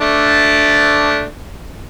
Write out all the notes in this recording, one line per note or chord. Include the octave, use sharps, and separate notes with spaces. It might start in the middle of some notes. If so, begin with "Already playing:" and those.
A3 D4